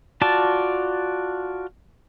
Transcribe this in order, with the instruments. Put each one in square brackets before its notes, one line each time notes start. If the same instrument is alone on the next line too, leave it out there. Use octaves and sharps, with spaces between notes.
[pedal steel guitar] F4 F#4 D5 A5